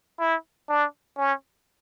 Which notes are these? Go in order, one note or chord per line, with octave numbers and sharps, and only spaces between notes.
E4
D4
C#4